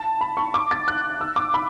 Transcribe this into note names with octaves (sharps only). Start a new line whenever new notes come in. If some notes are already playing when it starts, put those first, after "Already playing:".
Already playing: A5
B5
C#6
D6
A6
F#6
E6
D6
B5